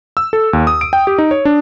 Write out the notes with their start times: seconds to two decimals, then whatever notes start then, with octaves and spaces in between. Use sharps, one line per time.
0.17 E6
0.33 A4
0.53 D#2
0.67 D#6
0.81 D7
0.93 G5
1.07 G4
1.18 D#4
1.31 C#5
1.45 D4